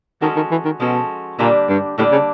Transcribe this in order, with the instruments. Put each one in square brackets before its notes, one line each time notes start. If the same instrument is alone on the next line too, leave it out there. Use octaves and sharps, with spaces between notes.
[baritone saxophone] D#3 [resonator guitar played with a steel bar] F3 G#3 C#4 F#4 A4
[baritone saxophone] D#3
E3
D#3
[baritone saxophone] B2 [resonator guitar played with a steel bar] F3 G#3 C#4 F#4 A4
[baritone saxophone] A#2 [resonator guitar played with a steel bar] D3 G3 A#3 D4 G4
[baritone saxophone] G2
[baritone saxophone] A2 [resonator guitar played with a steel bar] D3 G3 A#3 D4 G4
[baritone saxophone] C#3